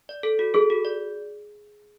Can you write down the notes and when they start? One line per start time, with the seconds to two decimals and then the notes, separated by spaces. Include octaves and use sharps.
0.09 D5
0.23 A4
0.39 F#4
0.54 G#4 A4
0.70 F#4
0.85 D5